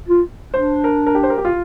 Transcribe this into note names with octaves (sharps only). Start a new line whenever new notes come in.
F4
D4 C5
A#4
A#4
G4
C5
A#4
G4
F4